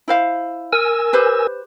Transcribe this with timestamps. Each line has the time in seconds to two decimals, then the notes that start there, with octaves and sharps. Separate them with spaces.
0.08 E4 C5 F5
0.73 A#4 G#5 E6
1.13 G4 B4 C5